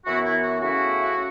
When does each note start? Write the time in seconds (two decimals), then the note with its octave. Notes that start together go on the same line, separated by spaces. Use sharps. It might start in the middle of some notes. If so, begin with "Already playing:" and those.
0.06 F#2 E3 B3 E4 F#4
0.25 E4
0.43 F#4
0.61 C#3 A3 C#4 E4 F#4